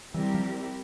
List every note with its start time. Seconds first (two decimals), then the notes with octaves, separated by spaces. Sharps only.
0.14 E3 G3 C4 E4 G4 A#4
0.34 F3